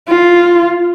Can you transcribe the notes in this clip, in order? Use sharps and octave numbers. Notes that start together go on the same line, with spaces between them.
F4